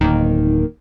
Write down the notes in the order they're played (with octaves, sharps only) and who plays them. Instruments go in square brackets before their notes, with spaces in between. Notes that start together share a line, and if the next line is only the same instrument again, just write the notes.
[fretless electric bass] D1 [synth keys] D#3 A#3